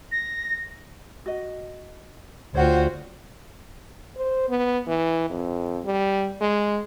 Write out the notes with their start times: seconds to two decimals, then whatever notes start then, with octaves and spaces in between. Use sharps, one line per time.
0.12 A#6
1.26 F#4 D#5
2.55 D2 F4 F#4 C5 C#5 F#5 G5
4.17 C5
4.49 B3
4.88 E3
5.30 F2
5.85 G3
6.41 G#3